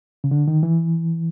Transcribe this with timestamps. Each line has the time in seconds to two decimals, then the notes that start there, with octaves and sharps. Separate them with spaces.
0.24 C#3
0.31 D3
0.48 D#3
0.63 E3